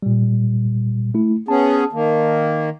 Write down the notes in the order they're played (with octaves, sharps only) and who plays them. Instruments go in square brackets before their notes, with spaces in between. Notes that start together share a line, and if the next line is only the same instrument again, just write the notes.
[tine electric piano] A#2 G3
A3 E4
[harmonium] B3 C#4 G#4 [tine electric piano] A5
[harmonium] D#3 A#3